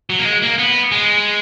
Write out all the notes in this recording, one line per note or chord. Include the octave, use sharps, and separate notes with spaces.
F#3
A#3
G#3
A#3
B3
G#3